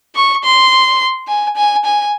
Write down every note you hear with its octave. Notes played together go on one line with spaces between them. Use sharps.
C#6
C6
G#5
G#5
G#5